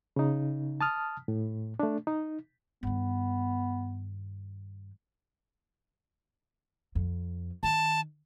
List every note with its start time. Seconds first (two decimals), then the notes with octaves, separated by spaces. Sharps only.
0.16 C#3 D#4
0.81 A5 D#6 F6
1.28 A2
1.79 A3 D4
2.07 D#4
2.83 G2 D#3 B3
6.95 F2
7.63 D#3 A5